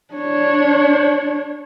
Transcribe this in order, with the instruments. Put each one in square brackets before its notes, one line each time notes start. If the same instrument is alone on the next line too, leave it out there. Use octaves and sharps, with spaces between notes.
[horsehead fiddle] D4 C#5